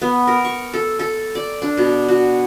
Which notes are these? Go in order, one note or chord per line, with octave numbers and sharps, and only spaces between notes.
B3
A#4
C#6
A4
A4
D5
D4
B2
F#4